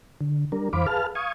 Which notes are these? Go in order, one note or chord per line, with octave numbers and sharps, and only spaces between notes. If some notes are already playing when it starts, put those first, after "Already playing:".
D3
G3 D4 A#4
F2 E3 C5 F5 B5 D6
G#4 B4 F5 A5 F6
F5 C#6 D#6 G#6